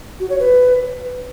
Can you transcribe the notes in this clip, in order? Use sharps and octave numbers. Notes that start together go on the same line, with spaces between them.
F#4
C#5
B4